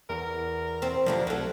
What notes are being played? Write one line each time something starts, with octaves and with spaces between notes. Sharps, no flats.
E2 A#4
C4
D2 G2 D3 F3 A#4
C2 F#3 A4